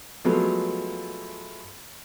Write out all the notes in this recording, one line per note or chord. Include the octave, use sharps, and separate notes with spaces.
F3 F#3 G#3 A3 B3